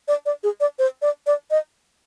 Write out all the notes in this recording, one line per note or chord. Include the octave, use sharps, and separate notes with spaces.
D5
D5
G#4
D5
C5
D5
D5
D#5